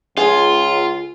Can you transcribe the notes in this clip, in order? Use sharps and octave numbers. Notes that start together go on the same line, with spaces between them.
C#2 F4 G#4